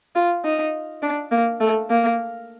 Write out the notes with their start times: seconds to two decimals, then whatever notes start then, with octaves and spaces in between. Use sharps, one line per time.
0.15 F4
0.45 D#4
1.02 D4
1.31 A#3
1.60 A3
1.90 A#3